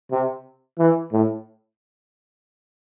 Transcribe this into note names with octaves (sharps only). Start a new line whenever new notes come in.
C3
E3
A2